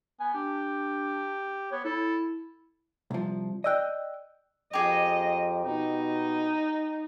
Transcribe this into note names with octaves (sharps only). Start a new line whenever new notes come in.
B3 G#5
D4 G4
B3 C#5
E4 A4
C2 F3
D5 D#5 G5 E6 F#6
F2 G4 G#4 D#5
B2 D#4